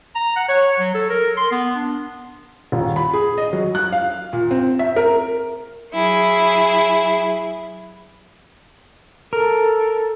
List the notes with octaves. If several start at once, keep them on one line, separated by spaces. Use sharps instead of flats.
A#5
F#5
C#5
F#3
A4
A#4
C6
B3
D4
D#1
B5
G#4
D#5
F#3
F#6
F5
A#2
C4
E5
A#4
F#3 E4 G#4
A4 A#4